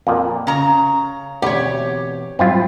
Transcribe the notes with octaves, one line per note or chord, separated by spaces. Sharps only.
F2 A#2
C#3 A#5
D2 B2 E3 C4 G4 C#5
G#2 F#3 G3 C4 E4 F4